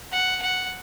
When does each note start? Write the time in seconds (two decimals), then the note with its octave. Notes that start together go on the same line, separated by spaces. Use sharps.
0.12 F#5
0.42 F#5